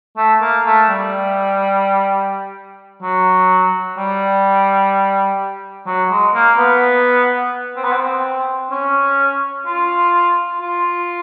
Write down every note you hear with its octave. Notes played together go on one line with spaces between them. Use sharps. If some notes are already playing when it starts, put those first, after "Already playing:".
A3
A#3
A3
G3
F#3
G3
F#3
G#3
A#3
B3
C4
B3
C4
C#4
F4
F4